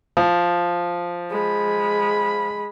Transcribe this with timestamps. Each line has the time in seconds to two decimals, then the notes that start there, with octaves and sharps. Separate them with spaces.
0.17 F3
1.30 G#3 B5